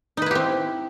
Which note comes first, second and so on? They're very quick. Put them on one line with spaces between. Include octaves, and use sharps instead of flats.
D#4 B4 E4 G4 C4